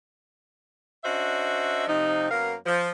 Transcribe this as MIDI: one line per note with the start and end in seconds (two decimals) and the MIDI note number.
1.04 1.87 61
1.04 1.87 62
1.04 1.87 66
1.04 1.87 72
1.04 1.87 75
1.04 1.87 76
1.87 2.30 48
1.87 2.30 53
1.87 2.30 63
2.31 2.54 42
2.31 2.54 58
2.31 2.54 59
2.31 2.54 70
2.31 2.54 77
2.66 2.90 53